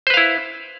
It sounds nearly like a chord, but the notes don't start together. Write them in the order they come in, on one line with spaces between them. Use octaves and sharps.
C5 B4 F5 E4